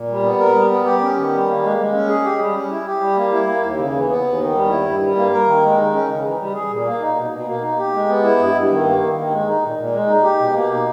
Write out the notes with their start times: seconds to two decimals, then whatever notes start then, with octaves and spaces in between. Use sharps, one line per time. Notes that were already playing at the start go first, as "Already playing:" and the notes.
Already playing: A#2
0.09 G3
0.23 B3
0.39 A#4
0.55 G3
0.71 B3
0.85 G4
1.01 C#4
1.17 D#3
1.31 G3
1.47 A#3
1.63 G#3
1.77 G#3
1.94 C#4
2.08 G#4
2.24 G4
2.39 G3
2.54 C#4
2.70 E4
2.86 G4
3.00 G3
3.16 A#3
3.31 E4
3.47 A#3
3.62 D#2
3.78 C#3
3.93 E3
4.09 B3
4.23 D#2
4.40 D#3
4.54 G3
4.70 E4
4.85 G2
5.01 G3
5.16 A#3
5.32 A#4
5.46 D#3
5.63 G#3
5.77 D#4
5.93 C#4
6.09 C#3
6.23 E3
6.39 G3
6.54 G#4
6.70 A#2
6.85 A#3
7.00 D#4
7.16 B2
7.31 B2
7.46 A#3
7.61 D#4
7.77 G4
7.93 G#3
8.08 B3
8.23 E4
8.39 G2
8.54 G2
8.70 D#3
8.84 A#3
9.00 D#3
9.16 D#3
9.31 G#3
9.46 D#4
9.62 A#2
9.77 A#2
9.92 G#3
10.07 D#4
10.23 G4
10.39 B2
10.53 A#3
10.70 D#4